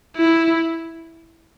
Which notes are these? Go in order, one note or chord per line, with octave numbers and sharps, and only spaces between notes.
E4